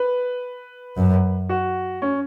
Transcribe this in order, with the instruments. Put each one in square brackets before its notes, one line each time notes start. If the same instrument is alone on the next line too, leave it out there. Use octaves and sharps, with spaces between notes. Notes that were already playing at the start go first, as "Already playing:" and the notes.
Already playing: [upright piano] B4
[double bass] F#2
[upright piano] F#4
C#4